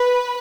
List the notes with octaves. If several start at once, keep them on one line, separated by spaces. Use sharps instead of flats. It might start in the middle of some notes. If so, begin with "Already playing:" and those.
Already playing: B4